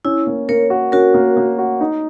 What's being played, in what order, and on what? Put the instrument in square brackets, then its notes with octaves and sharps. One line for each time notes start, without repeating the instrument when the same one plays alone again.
[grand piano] C#4 [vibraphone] E4
[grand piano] A#3
[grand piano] A#3 [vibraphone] A#4 C#5
[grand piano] F#4
[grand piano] C#4 [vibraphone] F#4 A#4
[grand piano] A#3
A#3
F#4
D#4